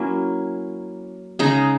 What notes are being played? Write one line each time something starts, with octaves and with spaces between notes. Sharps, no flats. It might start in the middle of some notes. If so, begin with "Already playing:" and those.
Already playing: F#3 A#3 C#4 E4
C#3 G#3 D#4 A#5